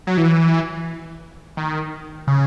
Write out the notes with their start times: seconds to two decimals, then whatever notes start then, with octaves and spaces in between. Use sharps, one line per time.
0.07 F#3
0.17 E3
1.57 D#3
2.27 C#3